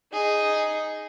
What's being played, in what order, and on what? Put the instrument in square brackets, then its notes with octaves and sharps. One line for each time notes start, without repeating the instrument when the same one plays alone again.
[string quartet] D#4 G#4